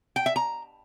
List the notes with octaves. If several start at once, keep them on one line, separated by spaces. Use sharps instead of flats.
G5
E5
A#5